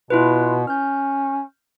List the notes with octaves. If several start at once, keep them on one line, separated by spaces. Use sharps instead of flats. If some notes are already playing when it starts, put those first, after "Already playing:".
B2 E4 F4 B4
C#4 F6 G6